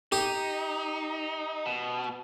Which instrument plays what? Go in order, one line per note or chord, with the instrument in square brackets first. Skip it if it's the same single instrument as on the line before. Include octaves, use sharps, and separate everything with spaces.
[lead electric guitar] D#4 [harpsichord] G4
[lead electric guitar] B2